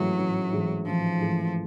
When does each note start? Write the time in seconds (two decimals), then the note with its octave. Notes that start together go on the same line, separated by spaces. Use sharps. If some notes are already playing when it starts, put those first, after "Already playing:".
Already playing: A1 G#2 E3 F#3 A3
0.19 A1
0.53 G#2 E3 A3
0.87 A1 F3
1.21 G#2 E3 A3